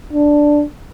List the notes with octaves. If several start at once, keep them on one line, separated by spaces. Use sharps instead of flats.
D4